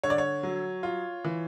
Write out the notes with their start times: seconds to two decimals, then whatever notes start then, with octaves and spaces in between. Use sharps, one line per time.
0.03 D3 C#5
0.10 D5
0.18 C#5
0.43 F#3
0.83 F4
1.25 E3